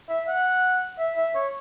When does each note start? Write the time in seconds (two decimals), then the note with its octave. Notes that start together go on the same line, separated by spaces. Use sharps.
0.09 E5
0.28 F#5
0.98 E5
1.17 E5
1.35 C#5